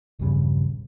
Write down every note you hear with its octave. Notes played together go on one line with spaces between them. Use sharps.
A#1 E2 G2 C#3